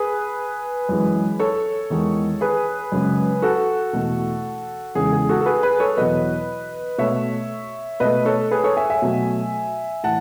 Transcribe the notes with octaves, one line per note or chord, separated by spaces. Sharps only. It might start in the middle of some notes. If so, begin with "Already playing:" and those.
Already playing: G#4 B4
F#2 E3 G#3
A4 C#5
E2 D#3 G#3
G#4 B4
F#2 C#3 G#3
F#4 A4
E2 B2 A3
E2 C#3 G#3 G#4
G#4
F#4 A4
A4
G#4 B4
G#4 B4
A4 C#5
E2 B2 F#3 B4 D#5
B2 A3 C#5 E5
B2 A3 B4 D#5
A4 C#5
G#4 B4
A4 C#5
E5 G#5
E5 G#5
B2 F#3 A3
A2 E3 F#5 A5